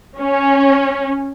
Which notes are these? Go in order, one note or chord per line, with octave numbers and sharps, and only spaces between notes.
C#4